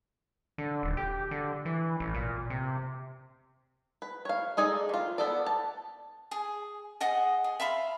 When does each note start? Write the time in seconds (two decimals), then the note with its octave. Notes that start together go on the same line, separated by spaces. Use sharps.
0.58 D3
0.83 D#1
0.97 G4
1.31 D3
1.65 E3
2.00 A1
2.14 A#2
2.50 C3
4.02 B4
4.25 C#5 F5
4.57 G#3 D#4 G#4 A4 D5
4.89 D#3 F4
5.18 B3 A4 D5
5.46 A5
6.31 G#4
7.00 G#4 D#5 F#5 D#6
7.44 G#4
7.60 E5 F5 B5 C6